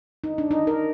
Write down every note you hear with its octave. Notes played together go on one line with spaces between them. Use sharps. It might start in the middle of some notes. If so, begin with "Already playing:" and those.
D#4
D4
D#4
A#4